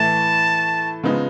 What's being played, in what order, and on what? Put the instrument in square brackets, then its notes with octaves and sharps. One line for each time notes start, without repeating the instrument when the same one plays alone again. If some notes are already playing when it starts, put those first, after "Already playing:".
Already playing: [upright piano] A2 E3 A3 [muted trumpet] A5
[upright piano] C#3 F3 G#3 B3 D#4